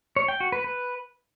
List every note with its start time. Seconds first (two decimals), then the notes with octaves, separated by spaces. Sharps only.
0.16 C#5
0.28 G5
0.40 F#4
0.52 B4
0.64 B4